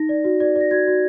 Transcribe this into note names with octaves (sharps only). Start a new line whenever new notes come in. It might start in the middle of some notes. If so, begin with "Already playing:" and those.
Already playing: D#4 A#6
D5
F#4
D5
D5
A#6
F#4 G#6
F#4